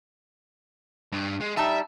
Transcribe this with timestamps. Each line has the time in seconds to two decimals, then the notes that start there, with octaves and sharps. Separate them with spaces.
1.12 G2
1.41 G#3
1.57 G3 D#4 E5 A5